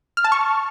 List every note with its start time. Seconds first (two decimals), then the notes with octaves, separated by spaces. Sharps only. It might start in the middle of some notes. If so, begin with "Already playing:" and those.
0.17 F6
0.24 A5
0.32 C#6